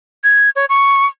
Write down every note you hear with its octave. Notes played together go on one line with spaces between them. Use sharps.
G#6
C#5
C#6